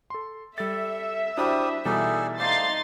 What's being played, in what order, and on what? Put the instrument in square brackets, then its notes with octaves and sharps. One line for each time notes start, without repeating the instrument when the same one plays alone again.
[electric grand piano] A4 C6
[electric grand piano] G3 A6 [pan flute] A4 [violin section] E5
[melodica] G3 D#6 [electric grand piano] D4 E4 F#4 [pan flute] C5
[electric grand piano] B2 E3 G3 [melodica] D#4 G#4 D5 [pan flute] A4
[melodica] A3 C5 D5 [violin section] D#4 C6 A6 [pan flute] F5